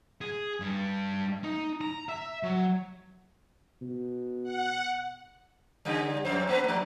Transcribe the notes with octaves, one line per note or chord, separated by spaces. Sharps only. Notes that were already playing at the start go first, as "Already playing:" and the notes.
G#4
G2
D#4
A#5
E5
F#3
B2
F#5
C#3 G3
F2 C5
A3 B3 B4
G2 F3